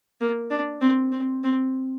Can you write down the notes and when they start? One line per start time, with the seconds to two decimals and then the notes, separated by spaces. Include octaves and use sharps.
0.21 A#3
0.50 D4
0.81 C4
1.12 C4
1.44 C4